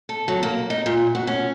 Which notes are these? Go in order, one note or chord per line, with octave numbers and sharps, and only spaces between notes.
A4
F#3
A#3
D#4
A#2
F#4
C#4